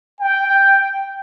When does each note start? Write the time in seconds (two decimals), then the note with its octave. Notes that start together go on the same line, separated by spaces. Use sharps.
0.20 G5